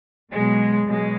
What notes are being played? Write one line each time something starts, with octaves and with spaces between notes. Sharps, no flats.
B2 F#3 G#3
B2 F#3 G#3